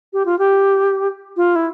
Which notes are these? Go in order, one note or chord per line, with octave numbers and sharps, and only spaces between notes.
G4
F4
G4
F4
E4